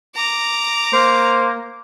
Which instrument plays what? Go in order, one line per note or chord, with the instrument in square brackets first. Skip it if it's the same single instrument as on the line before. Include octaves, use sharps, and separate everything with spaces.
[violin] A#5 D6
[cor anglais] A#3 [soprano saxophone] C5